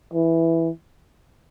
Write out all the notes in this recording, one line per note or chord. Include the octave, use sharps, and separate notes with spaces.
E3